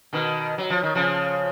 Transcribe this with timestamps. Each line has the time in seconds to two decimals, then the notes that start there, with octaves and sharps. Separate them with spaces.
0.13 B2 D#3
0.58 F#3
0.70 F3
0.83 D#3
0.95 C#3 F3